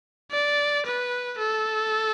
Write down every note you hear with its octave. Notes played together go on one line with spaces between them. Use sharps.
D5
B4
A4